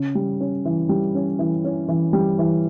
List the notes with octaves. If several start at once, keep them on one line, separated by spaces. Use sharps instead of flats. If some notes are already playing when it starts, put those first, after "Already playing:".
Already playing: C#3
G3
C#4
E3
G3
C#4
E3
C#4
E3
G3
E3